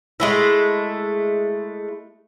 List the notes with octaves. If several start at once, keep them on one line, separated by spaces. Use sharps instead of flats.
G#3 A3 E4